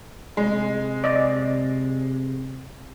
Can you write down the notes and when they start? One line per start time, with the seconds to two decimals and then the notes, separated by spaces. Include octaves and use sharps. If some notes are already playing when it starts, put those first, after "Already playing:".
0.37 C3 G#3
1.04 D5 D#5